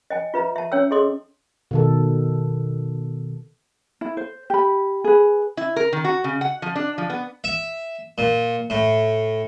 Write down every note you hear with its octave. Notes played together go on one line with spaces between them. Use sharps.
D#5 G5 G#5
F4 B4 E5 A#5
E5 A5
C#4 C#5 G5 E6
G#4 A4 D#5 C6 D6 D#6
B2 D#3 A4
E4
C5
G4 B5
G#4 B4
E4
A#4
D#3
F#4
C#3
F#5
F3
D4
F3
B3
E5
A#2
A2